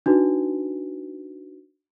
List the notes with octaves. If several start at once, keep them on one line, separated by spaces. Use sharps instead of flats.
D4 D#4 F#4 B4